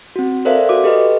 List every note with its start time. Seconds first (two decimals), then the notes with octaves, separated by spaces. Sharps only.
0.16 C4 F#4
0.45 A4 A#4 C5 D5 E5 F5
0.69 F#4 D6
0.84 G4 A4 B4 D#5